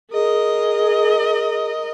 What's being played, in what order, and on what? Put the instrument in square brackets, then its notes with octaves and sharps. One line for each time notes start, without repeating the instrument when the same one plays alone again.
[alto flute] G#4 [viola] A#4 D#5